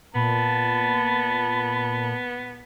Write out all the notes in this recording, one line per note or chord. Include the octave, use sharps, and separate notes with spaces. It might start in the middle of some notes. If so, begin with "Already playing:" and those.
A#2 B3 A5 B5